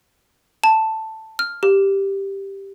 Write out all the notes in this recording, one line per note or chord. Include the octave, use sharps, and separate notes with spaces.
A5
F6
G4